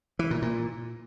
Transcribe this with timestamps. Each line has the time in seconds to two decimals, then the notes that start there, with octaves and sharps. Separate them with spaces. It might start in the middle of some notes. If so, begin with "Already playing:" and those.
0.19 E3
0.31 A#2
0.42 A#2